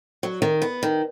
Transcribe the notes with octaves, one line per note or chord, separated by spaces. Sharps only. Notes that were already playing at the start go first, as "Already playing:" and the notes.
F#3
D#3
B3
D#3